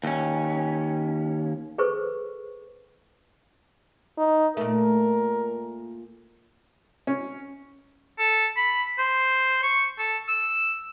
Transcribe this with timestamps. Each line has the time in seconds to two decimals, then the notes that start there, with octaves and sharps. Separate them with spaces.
0.04 D#2 C#4
1.78 G#4 A4 B4 C5 C#6
4.18 D#4
4.57 A#2 A3 A#4
7.07 C#4
8.19 A4
8.56 B5
8.98 C5
9.63 C#6
9.98 A4
10.28 E6